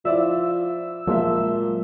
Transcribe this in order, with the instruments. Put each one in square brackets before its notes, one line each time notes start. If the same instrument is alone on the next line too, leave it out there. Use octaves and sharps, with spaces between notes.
[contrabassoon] F3 [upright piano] E4 D5 E5 [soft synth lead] E6
[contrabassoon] A#2 [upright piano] F3 E5 [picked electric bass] F#3 G#3 A#3